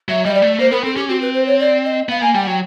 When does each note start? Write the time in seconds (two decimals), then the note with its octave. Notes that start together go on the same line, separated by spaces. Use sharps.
0.09 F#3 E5
0.24 G3 D#5
0.34 D5
0.42 A3
0.59 A#3 C5
0.71 B3 A#4
0.83 C4 A4
0.96 C#4 G4
1.09 C4 F#4
1.21 B4
1.34 C5
1.46 C#5
1.59 D5
1.84 D#5
2.09 B3 F5
2.21 A#3 G#5
2.34 G3 G5
2.42 F#5
2.47 F#3 G5